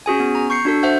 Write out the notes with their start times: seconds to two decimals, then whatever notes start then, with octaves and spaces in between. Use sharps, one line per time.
0.06 C#4 F#4 G#4 G#5
0.20 B3
0.35 A#5
0.50 C#6 G6 C7 C#7
0.65 D4 F#4 A4
0.83 C5 E5 F#5 G6